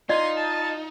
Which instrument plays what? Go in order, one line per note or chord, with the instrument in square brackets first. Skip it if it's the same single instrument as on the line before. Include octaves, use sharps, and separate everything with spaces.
[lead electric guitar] D#4 [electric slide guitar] F4 [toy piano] D5 D#5 [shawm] C6
[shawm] A5